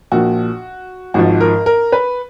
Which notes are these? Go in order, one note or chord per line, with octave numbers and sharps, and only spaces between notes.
A#1 A#2 F3 F#4
G#1 G#2 F3 F#4
A#4
A#4
B4